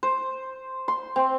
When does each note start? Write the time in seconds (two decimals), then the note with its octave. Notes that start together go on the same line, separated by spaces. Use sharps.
0.03 C5
0.88 C6
1.16 C4